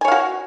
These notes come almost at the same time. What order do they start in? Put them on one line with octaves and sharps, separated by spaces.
G#5 C#5 F5 F#4